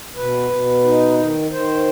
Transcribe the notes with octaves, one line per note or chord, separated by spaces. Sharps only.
B2 B4
B2
D#4
D#3
D#3 C5